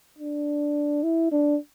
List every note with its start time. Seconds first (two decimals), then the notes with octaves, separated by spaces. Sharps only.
0.18 D4
1.03 E4
1.32 D4